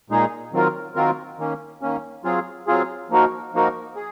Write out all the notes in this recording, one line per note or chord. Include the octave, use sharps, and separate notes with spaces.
A#2 G#3 D#4 G#4
D#3 F#3 C4 F4 A#4
D#3 F#3 C4 F4 A#4
D#3 A#3 C#4
D#3 A#3 C#4
F#3 C4 F4 G#4
F#3 C4 F4 G#4
F3 A#3 D#4 F#4 A#4
F3 A#3 D#4 F#4 A#4
G#4